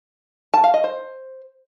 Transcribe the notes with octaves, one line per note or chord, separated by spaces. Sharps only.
A5
F5
D#5
C5